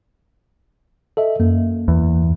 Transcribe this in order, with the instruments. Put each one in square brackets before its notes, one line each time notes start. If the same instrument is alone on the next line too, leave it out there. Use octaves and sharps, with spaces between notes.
[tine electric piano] A4 D#5 E5
F#2 A#3
[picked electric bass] E2